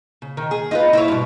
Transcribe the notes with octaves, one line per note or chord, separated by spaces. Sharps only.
C#3
D#3
G#4
D#4 F4 B4
E4 F4 C#5
G2 B2